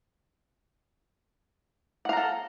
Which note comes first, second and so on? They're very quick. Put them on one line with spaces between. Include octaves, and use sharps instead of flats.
F#5 F5 A#5 A4